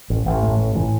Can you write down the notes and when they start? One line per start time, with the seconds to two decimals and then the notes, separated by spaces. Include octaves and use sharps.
0.10 A1
0.26 A1
0.43 A2
0.59 A1
0.75 A2 E3